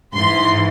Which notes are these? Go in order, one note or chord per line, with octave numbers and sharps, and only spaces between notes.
G#2 E3 C6